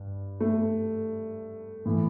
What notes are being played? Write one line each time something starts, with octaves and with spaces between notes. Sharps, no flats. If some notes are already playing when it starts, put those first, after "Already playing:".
Already playing: G2
A3
A2 E3